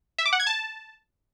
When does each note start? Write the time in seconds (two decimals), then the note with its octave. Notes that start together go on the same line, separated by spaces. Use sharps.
0.18 E5
0.26 D6
0.33 F#5
0.40 G#6
0.47 A5